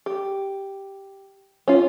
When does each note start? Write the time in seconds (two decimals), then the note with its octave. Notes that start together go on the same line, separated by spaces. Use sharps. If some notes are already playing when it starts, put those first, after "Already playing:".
0.06 G4
1.68 C#4 F4